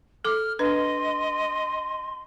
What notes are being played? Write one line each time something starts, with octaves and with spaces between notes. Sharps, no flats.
A4 D6 F6
D4 B4 D#5 C6